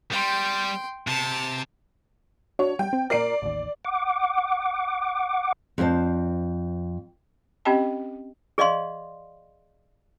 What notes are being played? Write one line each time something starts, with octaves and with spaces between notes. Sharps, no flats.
G3 G5 C6
C3 A5
D4 F#4 C#5
G3 G5
C4
A#2 A#4 D5 C7 D7
A1 D#2
F#5 D6
F2 A3 D4 C5 A5
C4 C#4 G4 D#5 G5 A5
G#4 D5 D#5 F5 C6